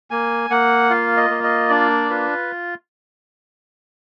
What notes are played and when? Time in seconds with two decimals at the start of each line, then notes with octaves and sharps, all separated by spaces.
0.11 A#3 G#5
0.50 A#3 F#5
0.90 F4 F5
1.17 D#5
1.30 A#3
1.44 D#5
1.69 D4 D5
2.10 F4 B4